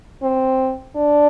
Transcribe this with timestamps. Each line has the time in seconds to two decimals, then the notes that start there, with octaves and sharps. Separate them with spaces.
0.22 C4
0.96 D4